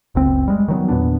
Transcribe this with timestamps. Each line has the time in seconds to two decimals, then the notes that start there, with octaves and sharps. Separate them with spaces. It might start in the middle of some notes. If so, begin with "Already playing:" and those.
0.15 F#1 C#2 C4
0.48 G3 G#3
0.68 D#3 F#3 B3
0.88 E2 A#2 B3 D4